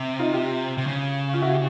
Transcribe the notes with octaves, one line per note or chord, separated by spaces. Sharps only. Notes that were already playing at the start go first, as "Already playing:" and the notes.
Already playing: C3
D#4 F4
F4 G4
C3
C#3
F4
E4 F#4
G4